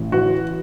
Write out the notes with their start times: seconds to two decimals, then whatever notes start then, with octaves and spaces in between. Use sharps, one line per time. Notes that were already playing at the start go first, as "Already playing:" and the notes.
Already playing: A1
0.12 E3 F#4